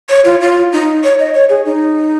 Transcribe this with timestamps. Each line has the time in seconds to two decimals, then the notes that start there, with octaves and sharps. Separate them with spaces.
0.10 C#5
0.25 F4
0.41 F4
0.72 D#4
1.04 C#5
1.19 D#5
1.34 C#5
1.50 G#4
1.66 D#4